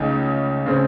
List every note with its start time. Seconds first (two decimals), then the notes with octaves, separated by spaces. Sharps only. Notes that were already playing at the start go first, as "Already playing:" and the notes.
Already playing: C#2 C#3 A3 D#4
0.66 C#3 A3 C4